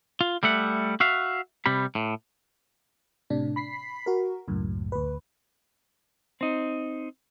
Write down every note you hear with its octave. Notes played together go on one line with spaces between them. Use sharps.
F4
G3 A3 E5 F#5
F#4 E5 F5
C3 G3 B5
A2
A2 C3 D4
B5 B6 C7
F#4 A#4
C#2 F#2 A2
D2 B4
C4 D#4